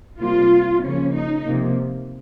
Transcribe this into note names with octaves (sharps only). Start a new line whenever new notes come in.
C3 G3 A#3 F4
C#3 F3 A#3 C#4
D#4
C3 F3 A#3